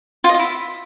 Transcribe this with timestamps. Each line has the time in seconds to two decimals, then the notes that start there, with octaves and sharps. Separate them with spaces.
0.24 F4
0.29 D#5
0.34 F4
0.39 E4
0.44 E5